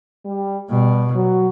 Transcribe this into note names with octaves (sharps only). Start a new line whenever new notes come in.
G3
B2 G3
F#3